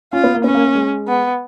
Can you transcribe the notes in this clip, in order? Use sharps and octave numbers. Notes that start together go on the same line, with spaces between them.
C#4 F4
B3
A#3
B3 C#4
A#3
A#3
G#3
B3